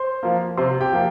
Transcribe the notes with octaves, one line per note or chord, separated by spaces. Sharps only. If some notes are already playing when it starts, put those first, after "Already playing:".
Already playing: C5 C6
F3 A#3
C3 C5 C6
G4 G5
F3 A#3